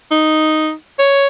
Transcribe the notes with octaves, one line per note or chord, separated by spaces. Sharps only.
D#4
C#5